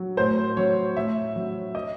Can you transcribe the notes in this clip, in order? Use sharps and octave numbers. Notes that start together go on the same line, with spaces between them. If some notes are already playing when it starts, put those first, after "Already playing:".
Already playing: F#3
A2 C5
F#3 C#5
A2 E5
F#3
D#5